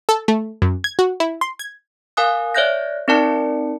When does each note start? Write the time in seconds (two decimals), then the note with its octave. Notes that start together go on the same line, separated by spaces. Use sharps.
0.09 A4
0.28 A3
0.62 F#2
0.84 G#6
0.99 F#4
1.20 E4
1.41 C6
1.59 G#6
2.17 A#4 F5 G#5 D#6 F#6
2.54 C#5 D5 E5 F#6 G6 A#6
3.08 C4 D#4 A#4 D5 A5 C#7